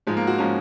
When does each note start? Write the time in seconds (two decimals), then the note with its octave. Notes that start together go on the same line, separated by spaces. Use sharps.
0.07 G#2 F3 G#3
0.17 A#3
0.27 F#4
0.38 F3 G#3 C#4